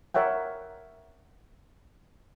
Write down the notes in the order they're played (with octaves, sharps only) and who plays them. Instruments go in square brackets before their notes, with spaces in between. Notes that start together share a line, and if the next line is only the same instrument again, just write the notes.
[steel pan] A#4 C#5 E5 F#5 G5